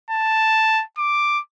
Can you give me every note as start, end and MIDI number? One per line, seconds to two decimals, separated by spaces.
0.10 0.83 81
0.98 1.40 86